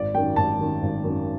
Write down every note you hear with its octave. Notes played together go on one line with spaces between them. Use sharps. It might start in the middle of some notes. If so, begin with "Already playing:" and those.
Already playing: G#1 D5
F#2 D#3 G5
G#1 A5
F#2 D#3
G#1
F#2 D#3